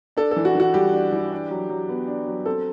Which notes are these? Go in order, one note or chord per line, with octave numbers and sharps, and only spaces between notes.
D4 A4
A4
E3
F#4
E3 F#4
G3 G4
D4
E3
D4
F#3
F#3
B3
D4
F#3
C4 A4